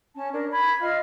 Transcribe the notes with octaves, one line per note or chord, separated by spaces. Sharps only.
C#4 A5
D4 A#4
B5 G#6
F4 D#5 F5 F6